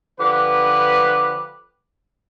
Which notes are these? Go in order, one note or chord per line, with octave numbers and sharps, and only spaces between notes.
D3 F3 G4 B4